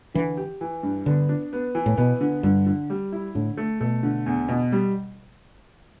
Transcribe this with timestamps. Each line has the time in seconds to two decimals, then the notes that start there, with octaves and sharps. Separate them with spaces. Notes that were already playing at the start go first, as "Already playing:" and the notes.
0.14 D3 E3
0.37 G4
0.61 E3
0.83 G2
1.06 D3 B3
1.29 D4
1.53 B3
1.75 E3
1.86 A2
1.97 B2 B3
2.21 D3
2.43 G2 D3
2.66 D3
2.90 G3
3.12 E4
3.35 A2 D3
3.57 A3
3.80 B2 A3
4.03 D3
4.26 E2
4.48 B2
4.72 G3